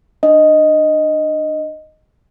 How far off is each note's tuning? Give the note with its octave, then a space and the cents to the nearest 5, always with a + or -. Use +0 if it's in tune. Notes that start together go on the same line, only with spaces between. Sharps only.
D4 +25 D#5 +0